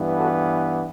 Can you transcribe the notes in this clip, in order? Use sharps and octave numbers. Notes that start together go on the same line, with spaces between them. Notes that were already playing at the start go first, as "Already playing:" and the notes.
Already playing: G2 E3 B3
F#4 A4